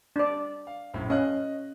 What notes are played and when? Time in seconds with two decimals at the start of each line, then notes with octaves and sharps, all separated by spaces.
0.16 D4 D5
0.67 F5
0.94 A#1 F#2 A2
1.10 C#4 D#5 F5 F#6